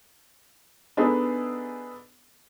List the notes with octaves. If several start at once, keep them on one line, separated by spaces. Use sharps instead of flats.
B3 D4 D#4 G#4 A4